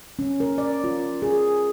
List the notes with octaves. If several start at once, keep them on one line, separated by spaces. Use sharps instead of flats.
C#4
A#4
D5
F4
G#4